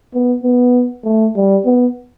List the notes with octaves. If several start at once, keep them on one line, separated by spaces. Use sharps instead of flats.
B3
B3
A3
G3
B3